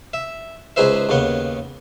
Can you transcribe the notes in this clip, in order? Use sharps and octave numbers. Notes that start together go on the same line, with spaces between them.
E5
C#2 D#4 G#4 B4 C5 E5
D#2 C#3 B3 F#5